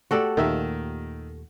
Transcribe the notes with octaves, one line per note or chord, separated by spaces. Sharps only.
A3 F#4 G4 A4 D5
D#2 A#2 D#3 E5